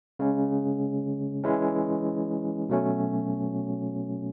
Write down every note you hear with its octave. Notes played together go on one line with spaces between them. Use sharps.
C#3 G#3 C#4
E3 G#3 C#4 E4
B2 F#3 A3 C#4